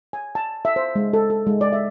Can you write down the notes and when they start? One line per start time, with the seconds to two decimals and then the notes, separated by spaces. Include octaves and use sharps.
0.13 G#5
0.35 A5
0.65 E5
0.76 C5
0.95 G#3
1.13 A4
1.30 A4
1.47 G#3
1.61 D5
1.73 E5